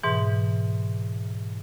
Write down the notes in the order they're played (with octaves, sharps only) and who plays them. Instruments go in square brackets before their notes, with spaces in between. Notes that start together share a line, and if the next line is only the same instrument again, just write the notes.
[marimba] G#2 B2 E3